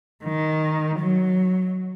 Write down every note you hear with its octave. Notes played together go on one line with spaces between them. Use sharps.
D#3
F#3